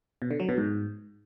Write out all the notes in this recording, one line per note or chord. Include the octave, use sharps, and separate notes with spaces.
B2
D3
F#3
B2
G#2